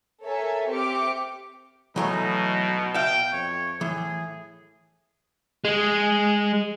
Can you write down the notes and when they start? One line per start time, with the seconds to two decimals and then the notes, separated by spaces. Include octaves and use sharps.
0.22 A4 A#4 C#5 E5 G#5
0.68 C4 G4 E5 D6 F6 C#7
1.96 B2 E3 F#3 A3 D#4
2.94 E5 F5 G5
3.33 F2 C#5
3.81 A2 E3 G#4
5.65 G#3